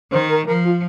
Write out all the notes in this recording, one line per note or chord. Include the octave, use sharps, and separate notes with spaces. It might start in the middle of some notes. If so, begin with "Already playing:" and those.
D#3 C5
A#4
F3 A#4
F4